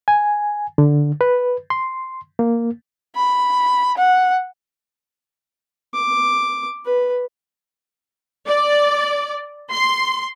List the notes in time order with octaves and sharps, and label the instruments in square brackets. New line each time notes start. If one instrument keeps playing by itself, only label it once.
[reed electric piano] G#5
D3
B4
C6
A#3
[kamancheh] B5
F#5
[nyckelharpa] D6
B4
[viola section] D5
C6